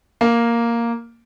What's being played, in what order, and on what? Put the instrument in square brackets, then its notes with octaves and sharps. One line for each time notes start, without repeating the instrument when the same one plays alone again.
[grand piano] A#3